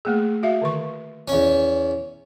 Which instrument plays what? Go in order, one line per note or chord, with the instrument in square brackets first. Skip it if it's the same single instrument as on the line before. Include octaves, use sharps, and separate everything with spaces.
[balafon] A3 A#3 G#4
F#4 E5 F5
D3 D#3 C#6
[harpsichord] E2 C#4